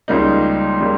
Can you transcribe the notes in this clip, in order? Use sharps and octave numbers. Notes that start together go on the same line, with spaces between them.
C#2 C#3 G3 A#3 D#4
C#3 G3 A#3